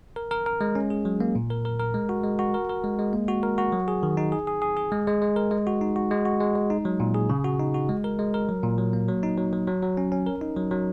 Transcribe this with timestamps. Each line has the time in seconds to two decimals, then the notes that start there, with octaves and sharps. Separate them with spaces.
0.16 A#4
0.31 A#4
0.46 A#4
0.61 G#3
0.75 C#4
0.90 G#4
1.05 F#3
1.20 A#3
1.35 A#2
1.50 A#4
1.65 A#4
1.80 A#4
1.94 G#3
2.09 F#4
2.24 G#3
2.39 F#4
2.54 A#4
2.69 A#4
2.84 G#3
2.99 G#3
3.13 A#3
3.28 F#4
3.43 A#4
3.58 F#4
3.72 F#3
3.88 G#4
4.03 D#3
4.17 D#4
4.32 G#4
4.47 G#4
4.62 G#4
4.77 G#4
4.92 G#3
5.07 G#3
5.22 G#3
5.36 A#4
5.51 G#3
5.67 F#4
5.81 D#4
5.96 F#4
6.11 G#3
6.25 F#4
6.40 G#3
6.55 G#3
6.70 D#4
6.85 F#3
7.00 A#2
7.14 G#4
7.30 C#3
7.44 F#4
7.59 D#4
7.74 F#4
7.89 G#3
8.04 A#4
8.19 G#3
8.34 A#4
8.49 F#3
8.63 A#2
8.78 F#3
8.93 A#3
9.08 F#3
9.23 D#4
9.38 F#3
9.53 F#3
9.68 F#3
9.82 F#3
9.97 C#4
10.12 C#4
10.26 A#4
10.41 D#4
10.57 F#3
10.71 F#3